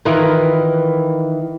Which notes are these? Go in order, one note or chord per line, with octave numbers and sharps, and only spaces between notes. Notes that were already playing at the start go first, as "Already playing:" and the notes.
D#3 E3 E4 F4 A#4 B4